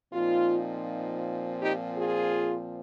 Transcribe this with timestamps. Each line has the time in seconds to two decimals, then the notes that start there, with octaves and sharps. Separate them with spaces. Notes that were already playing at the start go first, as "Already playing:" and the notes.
0.12 A#2 F3 C4 D#4 F4
1.60 D#4 G4
1.97 F4 G#4